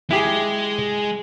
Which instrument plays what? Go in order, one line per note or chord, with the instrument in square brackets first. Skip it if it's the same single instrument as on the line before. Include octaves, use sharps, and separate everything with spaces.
[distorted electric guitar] G#3 [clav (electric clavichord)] E4 G4 G#4